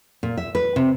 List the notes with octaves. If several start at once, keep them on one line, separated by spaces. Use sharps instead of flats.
A#2
E5
B4
C3